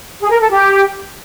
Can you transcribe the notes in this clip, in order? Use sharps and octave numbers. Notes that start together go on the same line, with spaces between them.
G#4
A#4
A4
G4